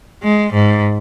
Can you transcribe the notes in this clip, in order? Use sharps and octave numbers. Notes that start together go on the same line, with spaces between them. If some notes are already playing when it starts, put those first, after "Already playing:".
G#3
G#2